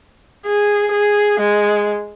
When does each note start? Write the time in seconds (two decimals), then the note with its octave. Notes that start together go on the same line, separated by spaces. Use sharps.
0.46 G#4
0.92 G#4
1.40 G#3